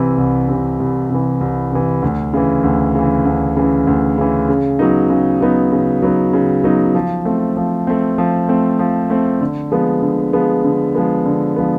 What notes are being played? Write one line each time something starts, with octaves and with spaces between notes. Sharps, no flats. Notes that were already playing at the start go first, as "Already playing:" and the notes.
Already playing: C2 C3 E3
C2
C3 E3
C2
C3 E3
C2
C3 E3
D2
C#3 E3
D2
C#3 E3
D2
C#3 E3
D2
C#3 E3
C#3
F#3 B3 D#4
C#3
F#3 B3 D#4
C#3
F#3 B3 D#4
C#3
F#3 B3 D#4
F3
A3 C4
F3
A3 C4
F3
A3 C4
F3
A3 C4
D3
F3 G#3 B3
D3
F3 G#3 B3
D3
F3 G#3 B3
D3
F3 G#3 B3